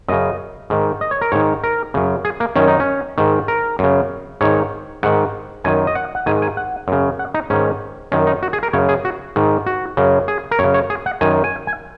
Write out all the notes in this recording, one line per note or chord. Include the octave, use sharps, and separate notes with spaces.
F#2 C#3 D#5
G#2 D#3
D#5
C#5
A#4
G#2 D#3 C#5
A#4
F#2 C#3
G#4
A#3
F#2 D#3 C#4
D#4
C#4
G#2 D#3
A#4
F#2 C#3
G#2 D#3 C#5
G#2 D#3 F#5
F#2 D#3 G#5
D#5
F#5
F#5
G#2 D#3 G#5
G#5
F#5
F#2 C#3
F#5
D#4
G#2 D#3 C#4
F#2 D#3 C#4
D#4
F#4
G#4
A#4
F#2 C#3 C#5
G#4
F#4
G#2 D#3
F#4
F#2 C#3
G#4
A#4
F#2 C#3 C#5
C#5
G#4
F#5
F#2 D#3 G#5
G#5
G#5